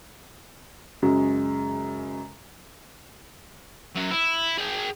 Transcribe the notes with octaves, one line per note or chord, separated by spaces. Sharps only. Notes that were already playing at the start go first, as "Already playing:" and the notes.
F#2 C#3 G#3
F#2 F#3
E4
G#4 G5